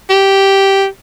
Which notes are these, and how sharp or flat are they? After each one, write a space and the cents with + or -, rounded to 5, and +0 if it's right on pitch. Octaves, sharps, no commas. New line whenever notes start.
G4 -5